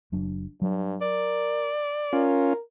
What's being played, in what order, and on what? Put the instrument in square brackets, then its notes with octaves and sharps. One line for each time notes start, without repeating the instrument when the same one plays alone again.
[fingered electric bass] F#1 F#3 D4
[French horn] G2 [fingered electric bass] F#3
[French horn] A#4 [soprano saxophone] D5
[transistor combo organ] C#4 F4 [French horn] A#4